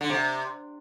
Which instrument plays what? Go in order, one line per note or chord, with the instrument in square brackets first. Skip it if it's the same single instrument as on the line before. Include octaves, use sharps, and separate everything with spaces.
[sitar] D3
C3